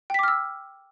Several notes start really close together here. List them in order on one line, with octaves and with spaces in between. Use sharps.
G5 B6 D6 F6 E6